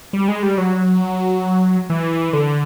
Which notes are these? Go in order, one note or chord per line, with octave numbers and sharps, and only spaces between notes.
G3
G#3
G3
F#3
E3
D3